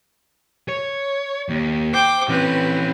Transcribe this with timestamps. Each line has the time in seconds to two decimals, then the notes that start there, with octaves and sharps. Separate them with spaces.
0.68 C#5
1.49 D#2
1.93 C5 G5 D6
2.29 E3 C4 C#4 B4